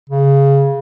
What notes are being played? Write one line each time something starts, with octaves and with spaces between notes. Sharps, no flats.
C#3